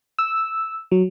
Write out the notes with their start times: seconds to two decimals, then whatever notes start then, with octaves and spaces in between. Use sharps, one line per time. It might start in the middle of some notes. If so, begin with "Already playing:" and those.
0.19 E6
0.92 F#3